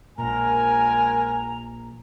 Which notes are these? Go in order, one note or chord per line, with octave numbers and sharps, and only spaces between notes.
A#1 A#2 F3 G#3 A#4 G#5 A#5